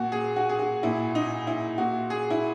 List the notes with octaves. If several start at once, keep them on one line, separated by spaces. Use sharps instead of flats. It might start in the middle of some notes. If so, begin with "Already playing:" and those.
Already playing: A#2 F#4
G#4
F#4
G#4
F#4
A#2 E4
D#4
E4
A#2 F#4
G#4
E4